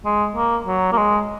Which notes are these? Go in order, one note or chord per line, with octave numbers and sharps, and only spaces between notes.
G#3
A#3
F#3
A#3
G#3